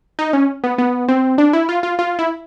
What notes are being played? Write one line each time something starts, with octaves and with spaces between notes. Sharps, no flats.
D#4
C#4
B3
B3
C4
D4
E4
F4
F4
F4
E4